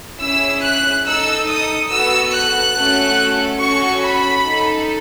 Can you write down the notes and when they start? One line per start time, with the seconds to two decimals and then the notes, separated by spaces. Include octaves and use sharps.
0.21 C#4 E4 G#4 E6
0.63 F#6
1.05 D#4 A4 E6
1.47 D#6
1.90 B3 F#4 A4 E6
2.32 F#6
2.74 A3 C#4 F#4 A4
3.59 C#4 F#4 A4 C#6
4.02 B5
4.45 D#4 A4